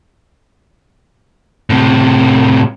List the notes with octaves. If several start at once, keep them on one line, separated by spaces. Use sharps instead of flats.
A2 C3